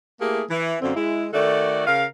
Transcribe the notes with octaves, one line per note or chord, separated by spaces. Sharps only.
A3 A#3 E4 G4 G#4
E3
F#2 D3 A#3 C4
G#3 E4
D#3 A3 F#4 A4 D5
C#3 A#4 F5